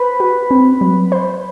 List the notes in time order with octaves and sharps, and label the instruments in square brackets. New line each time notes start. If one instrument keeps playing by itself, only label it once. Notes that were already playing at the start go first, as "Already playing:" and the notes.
Already playing: [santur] B4 [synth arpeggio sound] C5
[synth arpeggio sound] F#4
C4
F#3
C5